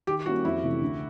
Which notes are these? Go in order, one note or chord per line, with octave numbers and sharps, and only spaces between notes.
D#3 G4
G3 A#3 C#4 E4 F#4
F2 E4
C3 E3 A3 C#4
D2